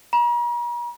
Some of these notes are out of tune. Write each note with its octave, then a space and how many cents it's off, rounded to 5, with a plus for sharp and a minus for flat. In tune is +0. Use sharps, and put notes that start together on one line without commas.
A#5 +45